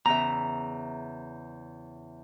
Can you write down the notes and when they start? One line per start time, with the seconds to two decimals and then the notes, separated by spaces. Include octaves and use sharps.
0.06 E2 C#3 E5 A#5